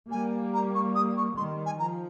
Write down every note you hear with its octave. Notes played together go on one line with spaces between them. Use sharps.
G3 A#3 G#5
A#5
C#6
D#6
C#6
D#3 G3 C6
G#5
F3 A#5